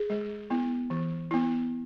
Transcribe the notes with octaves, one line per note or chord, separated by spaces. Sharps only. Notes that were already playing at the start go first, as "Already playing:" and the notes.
Already playing: G#4
G#3
B3 E4
E3
B3 E4